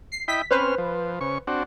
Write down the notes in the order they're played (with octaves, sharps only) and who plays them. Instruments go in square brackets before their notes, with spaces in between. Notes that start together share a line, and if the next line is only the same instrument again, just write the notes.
[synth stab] C7
[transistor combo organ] E4 D#5 G5 [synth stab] B6
[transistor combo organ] C4 C#4 F6 [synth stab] B4 C5
[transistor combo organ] F3
C#3 C#6
C4 D4 F#4